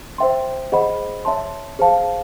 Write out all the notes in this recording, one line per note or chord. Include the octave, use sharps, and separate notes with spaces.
C5 E5 G5 C6
G#4 C5 D#5 F#5 B5
C#5 E5 A5 C6
G#4 C5 F5 A5